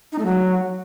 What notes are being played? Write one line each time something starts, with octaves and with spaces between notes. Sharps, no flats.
D#4
A3
F#3